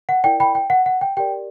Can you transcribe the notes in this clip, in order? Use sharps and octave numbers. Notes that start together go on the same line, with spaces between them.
F#5
E4 A#4 D5 G5
G5 B5
G5
F#5
F#5
G5
G4 A#4 D5 G5